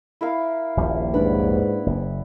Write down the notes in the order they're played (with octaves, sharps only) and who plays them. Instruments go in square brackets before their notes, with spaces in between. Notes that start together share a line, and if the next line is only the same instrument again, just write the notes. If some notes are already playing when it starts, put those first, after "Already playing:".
[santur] E4 A#4 F5
[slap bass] D#1 A#1 G3
[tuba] G#2 [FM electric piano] A#3 D4 B4 [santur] D5 F#5 B5
[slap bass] F#1